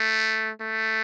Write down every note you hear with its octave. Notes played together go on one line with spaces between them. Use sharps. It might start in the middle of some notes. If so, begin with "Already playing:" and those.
Already playing: A3
A3